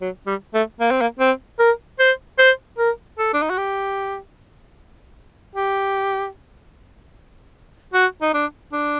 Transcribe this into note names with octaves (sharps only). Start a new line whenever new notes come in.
F#3
G3
A3
A#3
C4
A#3
C4
A#4
C5
C5
A#4
A4
D4
D#4
F#4
G4
G4
F#4
D#4
D4
D4